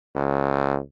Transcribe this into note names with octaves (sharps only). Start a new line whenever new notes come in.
C#2